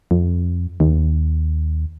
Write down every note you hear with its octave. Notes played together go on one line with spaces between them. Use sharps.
F2
D#2